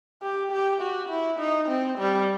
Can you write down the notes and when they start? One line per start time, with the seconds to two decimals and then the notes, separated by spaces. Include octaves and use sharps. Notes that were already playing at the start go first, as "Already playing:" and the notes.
0.22 G4
0.52 G4
0.81 F#4
1.10 E4
1.40 D#4
1.69 C4
1.98 G3